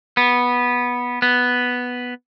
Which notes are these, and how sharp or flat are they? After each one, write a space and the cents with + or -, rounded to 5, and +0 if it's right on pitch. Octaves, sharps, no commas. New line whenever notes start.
B3 -10
B3 +0